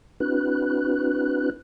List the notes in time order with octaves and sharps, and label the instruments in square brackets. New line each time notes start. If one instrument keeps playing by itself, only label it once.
[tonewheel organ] C4 D4 E4 F#4 B4 F#6